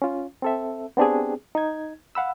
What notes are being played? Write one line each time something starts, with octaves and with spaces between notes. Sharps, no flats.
C#4 F4
C4 A4 E5
B3 C4 D4 G4 G#4
D#4 G#6
F5 F#5 B5 E6